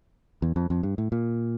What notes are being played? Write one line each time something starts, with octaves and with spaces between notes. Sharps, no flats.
E2
F2
F2
G2
A2
A#2